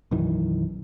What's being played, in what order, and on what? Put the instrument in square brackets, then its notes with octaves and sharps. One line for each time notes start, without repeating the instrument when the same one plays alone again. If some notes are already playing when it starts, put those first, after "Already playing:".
[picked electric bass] B1 F#2 D#3 E3